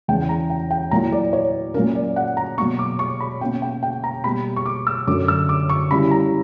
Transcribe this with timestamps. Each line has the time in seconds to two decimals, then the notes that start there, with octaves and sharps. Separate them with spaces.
0.08 E2 C#3 E3 G5
0.29 A#5
0.50 G5
0.71 G5
0.91 A#2 F#3 A#3 E4 A#5
1.12 D5
1.33 C#5
1.74 A#2 F#3 A#3 C#4 A#4
1.95 D5
2.16 F#5
2.37 A#5
2.58 B2 F#3 A#3 C#6
2.79 D6
2.99 C#6
3.20 B5
3.41 B2 A#3 C#4 G5
3.62 G5
3.83 G5
4.04 A#5
4.24 B2 G3 A#3 B5
4.56 C#6
4.66 D6
4.87 E6
5.07 F#2 D3 F#3 C#4 D6
5.28 E6
5.49 D6
5.69 C#6
5.91 C#3 G3 C#4 E4 B5
6.11 A#5